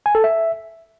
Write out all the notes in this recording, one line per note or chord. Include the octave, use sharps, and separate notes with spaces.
G#5
A4
E5